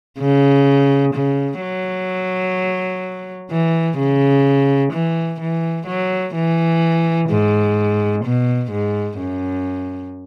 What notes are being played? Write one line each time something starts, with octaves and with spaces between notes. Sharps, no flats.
C#3
C#3
F#3
E3
C#3
E3
E3
F#3
E3
G#2
B2
G#2
F#2